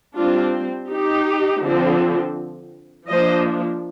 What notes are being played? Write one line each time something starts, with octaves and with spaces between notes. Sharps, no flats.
G3 C4 D4 F4
D#4 G4
D3 F3 C4
F3 A#3 D4 C5 D#5